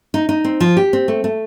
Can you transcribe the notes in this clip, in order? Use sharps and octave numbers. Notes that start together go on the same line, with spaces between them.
D#4
D#4
C4
F3
G4
C4
A3
A3